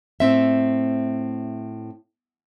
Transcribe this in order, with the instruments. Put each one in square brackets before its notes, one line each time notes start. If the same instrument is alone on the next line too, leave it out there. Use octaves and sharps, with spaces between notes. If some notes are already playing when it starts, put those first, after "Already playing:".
[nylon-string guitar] A2 C4 E5